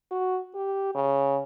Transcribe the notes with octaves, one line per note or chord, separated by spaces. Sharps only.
F#4
G4
C#3